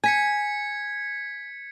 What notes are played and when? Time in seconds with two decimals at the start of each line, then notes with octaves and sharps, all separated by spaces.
0.04 G#5 G#6 B6 C#7